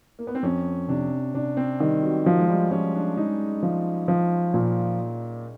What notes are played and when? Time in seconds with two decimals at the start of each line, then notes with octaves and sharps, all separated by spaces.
0.19 A#3
0.27 B3
0.35 C4
0.43 F2 C#4
0.88 C3 D4
1.34 C3 D4
1.57 C4
1.80 D#3 G3
2.03 F#3
2.26 F3 F#3
2.39 G#3
2.49 G3
2.71 F3 C#4
2.95 D4
3.17 G#3 D#4
3.63 F3
4.08 F3
4.54 A#2